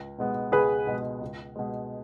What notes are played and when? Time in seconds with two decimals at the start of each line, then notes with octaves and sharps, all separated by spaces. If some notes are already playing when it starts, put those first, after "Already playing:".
Already playing: C#2
0.18 B2 G#3 B3
0.52 C#2 G#4 B4
0.87 B2 G#3 B3
1.21 C#2
1.56 B2 G#3